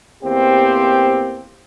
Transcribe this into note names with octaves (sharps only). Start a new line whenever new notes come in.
E2 A#3 C4 G4 C5